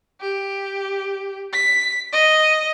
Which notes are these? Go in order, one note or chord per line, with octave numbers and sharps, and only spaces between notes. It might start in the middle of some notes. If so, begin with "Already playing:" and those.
G4
B6
D#5